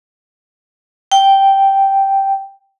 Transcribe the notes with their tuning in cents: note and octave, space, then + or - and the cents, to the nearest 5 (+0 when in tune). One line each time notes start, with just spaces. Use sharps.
G5 -5